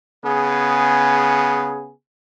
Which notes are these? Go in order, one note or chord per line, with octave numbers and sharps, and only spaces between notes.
C#3 B3 G#4